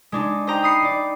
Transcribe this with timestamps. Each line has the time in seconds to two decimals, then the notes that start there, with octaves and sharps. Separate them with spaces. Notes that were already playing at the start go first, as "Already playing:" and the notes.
0.12 G#3 D4 D#4
0.47 C5 D#5 G5 A#5
0.62 B5 D#6 C7 C#7
0.82 D#4 D5